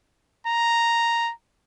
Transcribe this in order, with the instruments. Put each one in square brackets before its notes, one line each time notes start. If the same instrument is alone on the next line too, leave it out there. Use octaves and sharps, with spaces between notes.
[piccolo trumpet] A#5